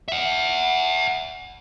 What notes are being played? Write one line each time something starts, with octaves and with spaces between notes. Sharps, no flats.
E5 F#5